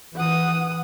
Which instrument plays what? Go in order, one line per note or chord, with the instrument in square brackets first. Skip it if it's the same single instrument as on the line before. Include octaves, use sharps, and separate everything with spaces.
[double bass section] E3 [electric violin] F#5 D#6